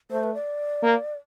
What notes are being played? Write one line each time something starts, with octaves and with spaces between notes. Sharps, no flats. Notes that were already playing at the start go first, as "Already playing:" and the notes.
A3 C5
B4
D5
A#3